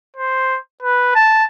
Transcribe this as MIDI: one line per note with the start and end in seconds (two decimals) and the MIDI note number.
0.16 0.58 72
0.82 1.15 71
1.15 1.45 81